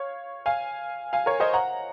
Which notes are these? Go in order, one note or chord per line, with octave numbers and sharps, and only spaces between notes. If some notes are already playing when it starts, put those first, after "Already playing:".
Already playing: C#5 F5
F5 G#5
F5 G#5
A#4 C#5
C5 D#5
F#5 A#5